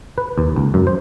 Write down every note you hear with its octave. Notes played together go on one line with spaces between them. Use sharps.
B4
D#2
C#2
F#2
C5